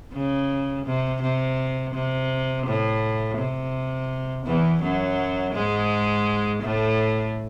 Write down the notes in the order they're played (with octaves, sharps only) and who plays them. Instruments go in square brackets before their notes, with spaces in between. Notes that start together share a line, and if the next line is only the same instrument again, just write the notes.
[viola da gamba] C#3
C3
C3
C3
A2
C3
E2 E3
F#2 F#3
G#2 G#3
A2 A3